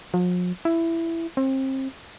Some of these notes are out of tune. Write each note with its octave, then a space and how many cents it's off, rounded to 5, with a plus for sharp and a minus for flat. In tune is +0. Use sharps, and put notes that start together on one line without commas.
F3 +45
E4 +10
C4 +30